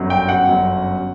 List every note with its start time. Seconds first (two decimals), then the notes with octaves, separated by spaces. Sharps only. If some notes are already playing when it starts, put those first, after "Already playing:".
Already playing: G1 F#2 F#3
0.10 G5
0.29 F#5
0.48 G1 F#2 F#3